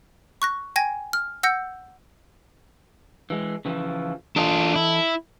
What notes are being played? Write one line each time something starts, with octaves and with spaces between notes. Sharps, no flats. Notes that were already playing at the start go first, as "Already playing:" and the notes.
C#6 F#6 A#6
G5 G#5 G#6 A#6
F6
F#5 E6 G6 A#6 C#7
E3 G#3
C#3 E3 F3
E3 D4 F4 A4 D#5
E4